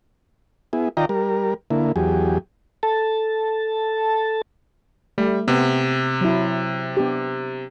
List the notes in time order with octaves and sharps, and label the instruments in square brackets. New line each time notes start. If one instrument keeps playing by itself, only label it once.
[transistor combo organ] B3 E4 G#4
D#3 F4 D5 D#5 G5 A#5
G3 A#4
D3 A#3 E4
E2 F#3 G4 G#4
[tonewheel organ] A4 A5
[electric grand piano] G3 [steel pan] A3
[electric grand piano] C3 [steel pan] B3
[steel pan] F#3 E4
B3 D4 G4